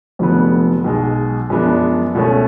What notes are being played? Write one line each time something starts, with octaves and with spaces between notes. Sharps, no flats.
F1 F2 D3 F#3 B3
B1 B2 G#3
F#2 F3 G#3 B3 D4
C#2 B2 A3 C#4